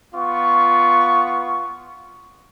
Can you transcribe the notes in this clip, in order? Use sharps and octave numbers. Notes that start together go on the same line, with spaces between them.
B3 F4 C#6